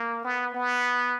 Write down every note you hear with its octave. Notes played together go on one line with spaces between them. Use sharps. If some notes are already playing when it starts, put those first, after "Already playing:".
Already playing: A#3
B3
B3